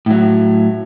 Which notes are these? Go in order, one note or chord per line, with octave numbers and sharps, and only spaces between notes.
A2 F#3